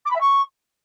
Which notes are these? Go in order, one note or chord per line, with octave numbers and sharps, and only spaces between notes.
D6
B5
E5
C#6